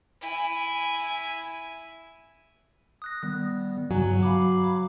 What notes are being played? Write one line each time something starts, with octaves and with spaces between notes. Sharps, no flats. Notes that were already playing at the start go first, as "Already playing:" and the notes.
E4 G#5
D#6 F#6 A#6
D#3 G3 B3
G2 C#3 F#3 G#5
F5 B5 D6